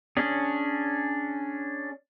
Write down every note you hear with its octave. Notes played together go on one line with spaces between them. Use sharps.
C#4 D4 G#4